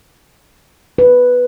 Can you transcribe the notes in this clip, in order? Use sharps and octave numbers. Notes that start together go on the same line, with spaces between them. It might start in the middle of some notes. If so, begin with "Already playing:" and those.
B4